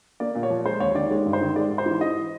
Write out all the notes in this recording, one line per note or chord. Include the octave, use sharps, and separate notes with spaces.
A#3 D5
A#2
C#5
F3
G#3 C5
D#2 C#5
D#3 D5
G#3 C#5
G2
C5
D#3
G#3 D5
G#2
C5
E3
E3 D#5